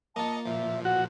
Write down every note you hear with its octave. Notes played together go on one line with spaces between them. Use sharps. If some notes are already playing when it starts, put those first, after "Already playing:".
A#3 F4 D#5 A5 C#7
A#2 F3 E5
F#4 F#5